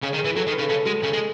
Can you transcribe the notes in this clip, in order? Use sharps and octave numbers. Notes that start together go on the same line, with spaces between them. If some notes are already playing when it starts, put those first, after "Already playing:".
C#3 G#4
D#3
G#4
E3
F#3 A4
D#3
B4
C#3
C#3 A4
G#3 F#4
C#3 G#4
G#3